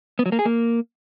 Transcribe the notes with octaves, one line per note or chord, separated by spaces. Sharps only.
B3
F#3
A#3
G#4
A#3